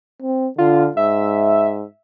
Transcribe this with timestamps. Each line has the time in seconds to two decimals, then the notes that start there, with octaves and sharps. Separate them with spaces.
0.22 C4
0.58 D3 F4
0.97 G#2 E5